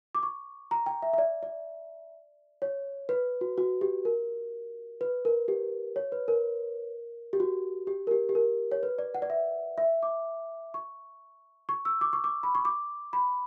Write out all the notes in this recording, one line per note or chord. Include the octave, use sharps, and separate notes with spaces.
D6
C#6
A#5
G5
E5
E5
D5
D5
C#5
B4
F#4
F#4
G4
A#4
B4
A#4
G4
C#5
B4
A#4
G4
F#4
G4
A#4
G4
G4
A#4
C#5
B4
D5
F#5
D5
E5
E5
D6
C#6
C#6
E6
D6
C#6
D6
B5
C#6
D6
B5